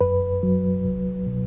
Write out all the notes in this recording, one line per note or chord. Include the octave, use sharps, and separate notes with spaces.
F#2 B4
F#3
C2
B2